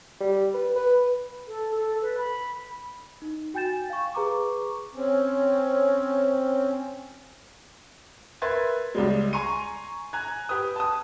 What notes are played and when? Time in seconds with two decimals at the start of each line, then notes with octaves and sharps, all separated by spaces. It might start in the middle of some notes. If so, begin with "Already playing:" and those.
0.21 G3
0.54 B4
0.76 B4
1.48 A4
1.77 A4
2.02 B4
2.18 B5
3.22 D#4
3.54 F#4 G5 G#5 G6 A6 E7
3.90 F5 C#6
4.14 G#4 B4 A#5 C#6 D6
4.95 C4 C#4
8.42 A#4 B4 E5 C6 G#6 A6
8.95 C#2 G3 G#3
9.33 G#5 A#5 C6 C#6 D#7
10.13 G#5 A#5 F#6 G#6
10.49 G4 B4 D#6
10.76 A5 D#6